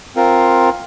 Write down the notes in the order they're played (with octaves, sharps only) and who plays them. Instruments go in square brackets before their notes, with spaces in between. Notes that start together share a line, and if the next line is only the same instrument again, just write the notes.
[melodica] C4 F4 A#4